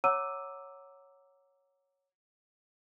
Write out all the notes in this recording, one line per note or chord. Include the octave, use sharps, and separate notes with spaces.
C#5 F#5 A#5 D6 E6 D#7